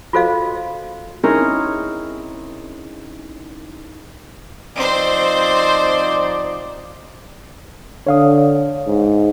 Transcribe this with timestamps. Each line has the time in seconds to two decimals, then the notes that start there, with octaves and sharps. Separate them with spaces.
0.13 F4 F#4 A4 C5 D#5 F5
1.23 C4 C#4 D#4 E4 G#4 A#4
4.76 F3 C4 D#4 C5 D5
8.07 D3 C#5 F5 D#6
8.87 G#2